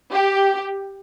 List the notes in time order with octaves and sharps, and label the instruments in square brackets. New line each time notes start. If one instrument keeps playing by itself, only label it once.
[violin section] G4